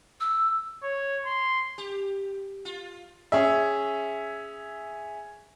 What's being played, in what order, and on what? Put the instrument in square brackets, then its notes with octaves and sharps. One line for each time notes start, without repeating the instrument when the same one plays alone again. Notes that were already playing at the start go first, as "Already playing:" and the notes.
[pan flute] E6
[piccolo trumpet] C#5
C6
[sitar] G4
F4
[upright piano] C#4 G#4 E5